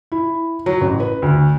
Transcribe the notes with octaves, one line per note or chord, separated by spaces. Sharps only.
E4
F#3
A1
B4
D2